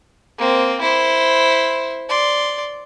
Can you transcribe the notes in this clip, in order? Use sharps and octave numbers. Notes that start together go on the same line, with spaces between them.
A#3 C4
E4 C5
D5 C6